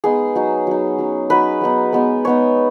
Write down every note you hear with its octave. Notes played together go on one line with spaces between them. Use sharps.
G#3 B3 D#4 G#4
F#3 D#4
F#3 D#4
F#3 C#4
F#3 B3 D#4 B4
F#3 B3 D#4
G#3 B3 D#4
G#3 B3 D#4 C#5